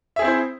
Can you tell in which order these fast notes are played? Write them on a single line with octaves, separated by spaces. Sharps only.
E5 G#4 C4 E4 C5